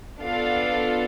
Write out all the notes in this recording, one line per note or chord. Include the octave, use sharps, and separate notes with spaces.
B3 D4 F4 A4 F5